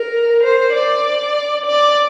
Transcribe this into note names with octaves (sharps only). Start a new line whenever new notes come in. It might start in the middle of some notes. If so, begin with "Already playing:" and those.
Already playing: A#4
C5
D5
D5